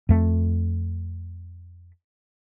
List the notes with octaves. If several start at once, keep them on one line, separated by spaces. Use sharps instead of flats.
F2 A3